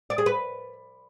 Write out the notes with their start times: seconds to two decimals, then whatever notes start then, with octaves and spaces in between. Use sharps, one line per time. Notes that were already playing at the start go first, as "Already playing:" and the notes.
0.10 D5
0.18 G#4
0.26 B4